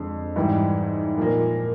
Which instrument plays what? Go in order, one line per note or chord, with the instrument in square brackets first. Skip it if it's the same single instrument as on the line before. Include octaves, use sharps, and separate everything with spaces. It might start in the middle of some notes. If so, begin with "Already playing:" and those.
Already playing: [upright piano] F2 D3 G#3
G#2 E3 G3
A#2 F3 A#3